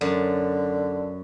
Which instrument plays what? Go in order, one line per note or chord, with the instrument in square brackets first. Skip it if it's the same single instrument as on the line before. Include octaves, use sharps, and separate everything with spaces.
[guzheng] F#2 [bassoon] D3